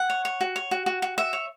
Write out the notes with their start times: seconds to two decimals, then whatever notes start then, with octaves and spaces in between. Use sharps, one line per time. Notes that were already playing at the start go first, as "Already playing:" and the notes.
Already playing: F#5
0.10 C#5
0.25 C#5
0.41 F#4
0.56 C#5
0.71 F#4
0.86 F#4
1.02 F#4
1.18 F#4 E5
1.33 C#5